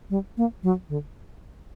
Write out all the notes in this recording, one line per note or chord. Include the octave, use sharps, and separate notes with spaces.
G3
A#3
F#3
D3